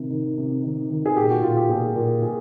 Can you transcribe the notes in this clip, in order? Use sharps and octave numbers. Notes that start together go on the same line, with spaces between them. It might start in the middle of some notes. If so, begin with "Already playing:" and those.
Already playing: C3 D#3
D#3
C3
D#3
D#3
G#4
A#2 G4
F#4
A#2 F4
G4
A#2 G#4
A#2
A#2 G#4